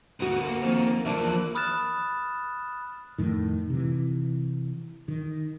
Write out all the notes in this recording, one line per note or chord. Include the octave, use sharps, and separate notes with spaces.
D2 D3 A#3 B3 F#4
F2 D#3
E2 F3 A#3 D4 E4 F#6
B5 D#6 F6 F#6 A6 E7
F2 A2 D#3
C3 E3
D#3